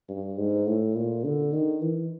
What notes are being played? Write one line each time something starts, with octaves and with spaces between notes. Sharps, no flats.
G2
G#2
A2
A#2
D3
D#3
E3